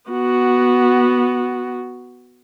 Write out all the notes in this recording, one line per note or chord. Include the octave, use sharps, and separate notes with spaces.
B3 F#4